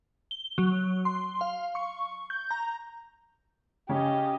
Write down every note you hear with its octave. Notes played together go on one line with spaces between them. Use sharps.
G7
F#3
C6
F5
C#6
G6
A#5
C#3 C#4 G4 D#5